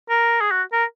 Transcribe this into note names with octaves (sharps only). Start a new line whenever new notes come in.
A#4
G#4
F#4
A#4